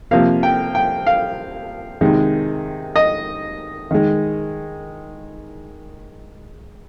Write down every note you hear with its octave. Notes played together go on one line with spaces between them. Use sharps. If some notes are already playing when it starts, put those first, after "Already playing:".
C3 F3 A#3 F5
G5
G5
F5
C3 D#3 G#3
D#5
D#3 G#3